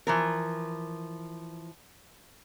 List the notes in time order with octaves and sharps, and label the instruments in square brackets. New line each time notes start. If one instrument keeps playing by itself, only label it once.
[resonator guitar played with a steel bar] E3 F3 A#4